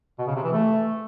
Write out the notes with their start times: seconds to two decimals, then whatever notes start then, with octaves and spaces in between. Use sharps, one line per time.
0.19 B2
0.27 C#3
0.36 C3
0.44 E3
0.52 A3